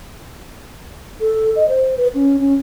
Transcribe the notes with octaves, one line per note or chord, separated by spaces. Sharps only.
A4
D#5
C5
B4
C#4
C#4